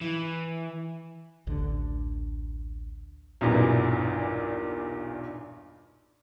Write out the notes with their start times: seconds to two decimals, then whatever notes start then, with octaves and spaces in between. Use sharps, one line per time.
0.01 E3
1.47 A1 D2 D3
3.41 B1 E2 G2 A#2